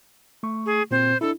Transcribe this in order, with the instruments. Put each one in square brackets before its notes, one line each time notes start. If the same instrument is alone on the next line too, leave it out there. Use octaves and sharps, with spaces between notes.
[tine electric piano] A3 C#6
[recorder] G#4
[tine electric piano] A#2 C4 [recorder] C5
[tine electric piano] D4 E4 [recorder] A4